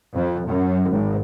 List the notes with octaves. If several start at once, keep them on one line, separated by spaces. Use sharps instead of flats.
F2
F#2
G#1